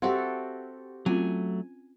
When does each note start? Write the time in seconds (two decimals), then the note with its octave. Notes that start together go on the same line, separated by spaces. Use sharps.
0.02 C4 F#4 G4 A4 E5 F#5
1.06 F#3 A3 C4 C#4 F4 G#5